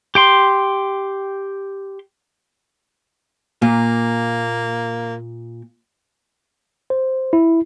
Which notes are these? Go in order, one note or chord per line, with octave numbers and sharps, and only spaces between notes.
G4 G5 C6
A#2 A#3
C5
E4